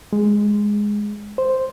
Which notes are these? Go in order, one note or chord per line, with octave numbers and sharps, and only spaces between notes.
G#3
C5